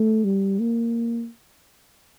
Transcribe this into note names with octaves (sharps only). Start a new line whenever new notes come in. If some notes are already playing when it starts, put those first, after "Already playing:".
Already playing: A3
G3
A#3